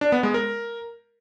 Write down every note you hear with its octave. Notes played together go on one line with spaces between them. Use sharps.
D4
B3
G#3
A#4